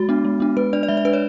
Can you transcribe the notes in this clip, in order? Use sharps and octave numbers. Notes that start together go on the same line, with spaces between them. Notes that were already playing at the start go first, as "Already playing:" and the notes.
Already playing: G#3 F#4
B3 D4
G#3
B3 D4
G#3 B4
D4 D5
D5
G#3 E5
D5
D4 B4
C#5